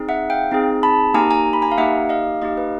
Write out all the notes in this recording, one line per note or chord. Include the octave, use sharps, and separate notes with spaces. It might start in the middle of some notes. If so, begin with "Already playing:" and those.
Already playing: C4 D#4 G#4
E5 F#5
F5 G5
C4 D#4 G#4
A5 B5
A#3 D#4 G4 G#5 A#5
G#5 A#5
B5
G#5 A#5
F5
A#3 D#4 G4 E5 F#5
D#5 F5
A#3 D#4 G4 D#5 F5
B4